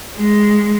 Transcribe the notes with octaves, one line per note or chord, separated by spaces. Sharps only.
G#3